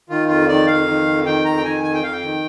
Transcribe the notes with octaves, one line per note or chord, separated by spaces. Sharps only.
D#3 F4
F2 F4
D#3 D5
F2 F5
D#3
F2
D#3 G5
F2 A#5
G5
D#3 G#5
F2 G#5
G5
F2 F5
G5
D#3